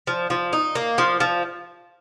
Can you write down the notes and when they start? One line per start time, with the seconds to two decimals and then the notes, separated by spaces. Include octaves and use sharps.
0.07 F3
0.30 F3
0.53 D#4
0.75 A#3
0.98 F3
1.20 F3